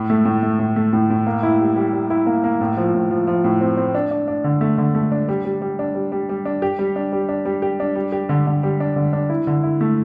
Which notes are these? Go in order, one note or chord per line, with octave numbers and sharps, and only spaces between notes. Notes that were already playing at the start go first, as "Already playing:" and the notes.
Already playing: A2
A3
A2
A3
A2
A3
A2
A2
A#3
E4
G3
G3
G3
E4
A#3
A#3
A2
F3
A2
F3
F3
A2
C4
C4
D4
D4
D4
D3
A3
D3
A3
D4
G3
G3
G3
D4
G3
G3
G3
D4
G4
G3
D4
G3
D4
G3
G4
D4
G3
G4
D3
D3
G3
D4
D3
D4
E4
D3
E4
A3